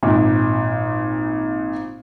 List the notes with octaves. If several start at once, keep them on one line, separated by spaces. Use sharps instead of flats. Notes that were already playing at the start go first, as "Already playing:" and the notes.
G#1 A#2